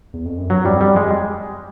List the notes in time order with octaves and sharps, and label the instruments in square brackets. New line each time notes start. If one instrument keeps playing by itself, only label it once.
[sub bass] E2
F2
F#2
[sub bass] G2 [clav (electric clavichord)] F#3
[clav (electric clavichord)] G3
[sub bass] F2
[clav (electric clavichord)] G3
G#3